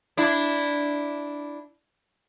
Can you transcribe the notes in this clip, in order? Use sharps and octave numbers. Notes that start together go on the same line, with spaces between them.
D4 E4